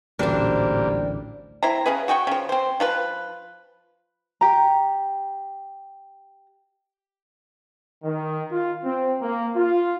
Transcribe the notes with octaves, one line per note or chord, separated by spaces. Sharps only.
A1 D2 A#2 G3 D4 C5
C4 E4 C5 A#5
C#3 C#4 G#4 B4
F#4 G#4 G5 C#6
C#3 F3
C4 C5
F3 F4 B4
G4 A#5
D#3
F4
C4
A#3
F4